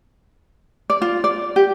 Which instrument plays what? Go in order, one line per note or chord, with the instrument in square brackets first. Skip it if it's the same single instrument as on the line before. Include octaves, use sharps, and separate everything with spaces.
[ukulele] D5
F4
D5
G4